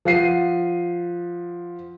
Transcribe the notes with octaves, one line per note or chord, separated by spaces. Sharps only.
F3 F#5 C7 D#7